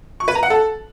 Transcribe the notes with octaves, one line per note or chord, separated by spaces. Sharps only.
C#6
B4
A#5
F#5
A4